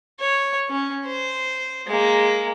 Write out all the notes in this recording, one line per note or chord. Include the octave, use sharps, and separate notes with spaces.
C#5
C#4
C5
G#3 A#3